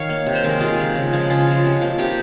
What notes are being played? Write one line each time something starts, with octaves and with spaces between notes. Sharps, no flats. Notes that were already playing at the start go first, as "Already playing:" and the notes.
Already playing: D#3 C#5 F5
A#3
C3
C5
D#3 G#3 A#4
C3 F4 G#4
D#3 G#3
C#3
F3 G#3
C#3 C#4 F4
F3 G#3
C3
F3 A#3
C3 D#4 G4